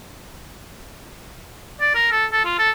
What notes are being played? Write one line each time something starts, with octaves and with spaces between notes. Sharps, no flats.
D5
A#4
A4
A4
F4
A4